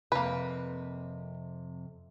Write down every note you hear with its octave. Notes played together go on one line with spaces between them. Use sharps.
F2 C3 A#3 B4